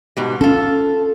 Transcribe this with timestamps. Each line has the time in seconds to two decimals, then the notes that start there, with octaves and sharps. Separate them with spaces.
0.17 G#2 B2 G3
0.41 C#4 F4 A4